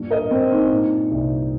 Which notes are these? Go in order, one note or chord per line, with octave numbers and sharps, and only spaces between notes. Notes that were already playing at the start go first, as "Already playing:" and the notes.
Already playing: G2 A#2
A#4 D#5
G2 C4
D#4
A#2
C2